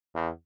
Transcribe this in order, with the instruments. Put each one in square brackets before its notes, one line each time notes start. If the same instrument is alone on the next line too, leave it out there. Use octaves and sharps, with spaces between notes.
[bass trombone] E2